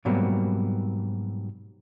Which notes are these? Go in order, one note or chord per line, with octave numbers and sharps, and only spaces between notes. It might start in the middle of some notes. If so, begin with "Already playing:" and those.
G#2 B2 F#3 G3 A#3 C4